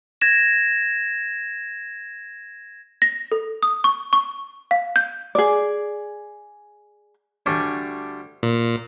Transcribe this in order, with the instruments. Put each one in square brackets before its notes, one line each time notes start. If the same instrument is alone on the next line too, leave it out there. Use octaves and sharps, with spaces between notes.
[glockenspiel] G#6 A#6 E7
[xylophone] A#6
A4
D#6
C#6
C#6
F5
G6
[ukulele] G#4 D5
[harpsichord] D2 G3 D4 G#5 C#6
[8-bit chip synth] A#2